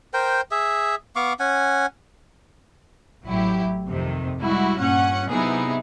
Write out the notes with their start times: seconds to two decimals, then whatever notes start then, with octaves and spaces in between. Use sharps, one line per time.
0.14 A#4 C5 G5
0.51 G#4 E5
1.16 B3 F5 C#6 D6
1.40 C#4 F#5 G#5
3.25 A1 F#3 E4 G4
3.86 F2 C3 D#3
4.41 G3 G#3 E4 F#4
4.80 G2 A#2 C#4 F#5
5.29 C3 F#3 B3 D#4 E4 G#4